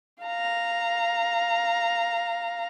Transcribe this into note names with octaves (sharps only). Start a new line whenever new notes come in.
F5 A#5